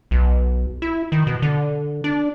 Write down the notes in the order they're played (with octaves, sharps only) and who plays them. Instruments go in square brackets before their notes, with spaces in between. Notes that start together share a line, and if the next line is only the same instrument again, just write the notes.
[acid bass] B1
E4
D#3
B2
D3
D4